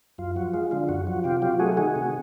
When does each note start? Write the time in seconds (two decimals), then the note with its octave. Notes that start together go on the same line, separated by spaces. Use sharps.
0.18 F#2 F4
0.36 F3 F#4
0.54 G#3 F4
0.71 D3 F4
0.89 F#2 F#4
1.07 F3 F#4
1.24 C3 F4 G4
1.42 F#3 F4 G4
1.59 A3 F#4 G#4
1.77 D#3 F#4 G#4
1.96 C3